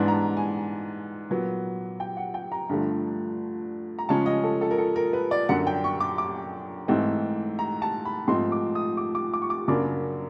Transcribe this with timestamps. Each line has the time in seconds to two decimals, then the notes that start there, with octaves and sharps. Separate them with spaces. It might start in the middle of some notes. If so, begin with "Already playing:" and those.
Already playing: G#2 E3 G#3 B3 D4
0.08 A#5
0.12 A5
0.37 G#5
1.29 A#2 F#3 B3
2.00 G5
2.17 F#5
2.34 G5
2.52 A#5
2.69 G2 D3 F3 A3
3.99 A#5
4.09 C#3 F3 G#3 C#4 A5
4.26 D#5
4.44 A4
4.61 A4
4.71 A#4
4.78 A4
4.96 A#4
5.13 B4
5.31 D5
5.49 F#2 D3 F#3 F#5
5.67 G5
5.84 C#6
6.00 D6
6.18 D6
6.88 G#2 E3 A3 C4 D#4
7.59 A#5
7.82 A5
8.05 B5
8.28 G#2 F3 A3 C4 D#4 C6
8.52 D6
8.75 D#6
8.97 D6
9.15 D6
9.33 D6
9.42 C#6
9.50 D6
9.68 F#2 C#3 F#3 A#3 D4 D6